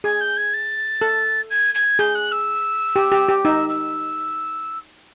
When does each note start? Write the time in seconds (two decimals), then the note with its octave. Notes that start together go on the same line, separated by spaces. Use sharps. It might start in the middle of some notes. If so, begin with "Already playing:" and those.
0.04 G#4 G#6
0.20 G6
0.37 G#6
0.53 A6
1.01 A4
1.50 G#6
1.74 G#6
1.99 G#4 G6
2.15 F#6
2.31 E6
2.96 G4
3.12 G4
3.28 G4
3.44 D#4 E6
3.69 E6